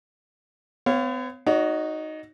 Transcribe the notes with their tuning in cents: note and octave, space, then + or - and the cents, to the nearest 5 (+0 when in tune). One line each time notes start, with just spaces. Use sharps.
B3 +45 C#5 -10 F5 +0
D#4 +0 F#4 +0 C#5 +45